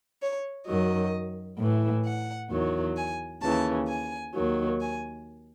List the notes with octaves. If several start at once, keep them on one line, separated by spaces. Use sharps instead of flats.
C#5
F#2 D#3 F#3 D#5
A2
E3
F#5
E2 D#3 F#3
G#5
D#2 C#3 E3 A5
G#5
D#2 D#3 F#3
G#5